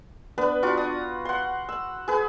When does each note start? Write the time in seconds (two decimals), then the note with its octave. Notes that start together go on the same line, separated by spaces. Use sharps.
0.38 B3 D4 B4
0.63 D4 F4 F#4
0.77 D#6
1.25 F#5 C6
1.69 E6
2.08 G#4 B4